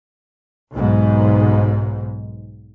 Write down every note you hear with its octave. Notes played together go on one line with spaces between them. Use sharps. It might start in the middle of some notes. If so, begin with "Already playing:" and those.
B1 G#2